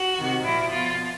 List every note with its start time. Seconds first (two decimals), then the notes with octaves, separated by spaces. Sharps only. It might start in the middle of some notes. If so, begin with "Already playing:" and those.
Already playing: F#4
0.16 C3 D#3
0.44 A#2 F3 E4
0.72 B2 F4